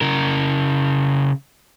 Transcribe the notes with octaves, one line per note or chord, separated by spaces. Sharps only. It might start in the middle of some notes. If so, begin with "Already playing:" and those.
C#3 A#4